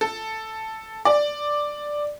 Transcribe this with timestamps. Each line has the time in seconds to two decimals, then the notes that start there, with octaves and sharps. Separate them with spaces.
0.01 A4
1.05 D5